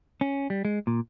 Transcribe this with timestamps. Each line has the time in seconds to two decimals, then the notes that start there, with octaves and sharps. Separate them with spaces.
0.21 C#4
0.50 G3
0.65 G#3
0.87 A#2